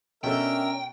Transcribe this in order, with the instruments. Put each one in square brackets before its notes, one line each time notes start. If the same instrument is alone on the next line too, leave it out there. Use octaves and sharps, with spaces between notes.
[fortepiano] B2 A4 [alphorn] C#4 [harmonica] D4 A#4 E5 [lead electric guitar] G5